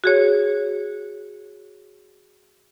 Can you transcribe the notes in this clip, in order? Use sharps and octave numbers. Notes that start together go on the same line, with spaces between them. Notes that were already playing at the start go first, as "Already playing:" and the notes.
F#4 G#4 C#5